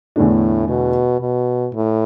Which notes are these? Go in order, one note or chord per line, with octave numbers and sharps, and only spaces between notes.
E2 A2 D3 A3 D4
B2
B2
A2